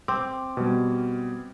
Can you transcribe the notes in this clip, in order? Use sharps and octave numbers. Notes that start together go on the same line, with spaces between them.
C4 D6
B2 G3